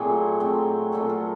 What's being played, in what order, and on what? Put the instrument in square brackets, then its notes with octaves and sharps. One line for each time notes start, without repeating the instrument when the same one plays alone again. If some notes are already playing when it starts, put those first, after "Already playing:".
Already playing: [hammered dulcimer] A#2 F#3 A3 C4 G#4
A#2 F#3 A3 C4
A#2 F#3 A3 C4 A4
A#4